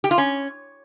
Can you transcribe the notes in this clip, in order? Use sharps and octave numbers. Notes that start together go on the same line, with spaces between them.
G4
F4
C#4